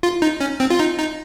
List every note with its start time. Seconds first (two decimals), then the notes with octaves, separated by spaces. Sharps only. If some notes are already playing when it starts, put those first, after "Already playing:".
0.03 F4
0.22 D#4
0.41 C#4
0.60 C4
0.70 F4
0.79 D#4
0.98 D#4